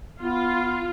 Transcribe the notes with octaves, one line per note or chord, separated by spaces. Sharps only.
B3 F4